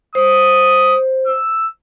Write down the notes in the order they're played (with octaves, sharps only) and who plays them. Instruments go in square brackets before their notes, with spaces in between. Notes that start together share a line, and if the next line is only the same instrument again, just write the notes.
[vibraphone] C5 [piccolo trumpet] D#6
[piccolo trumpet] E6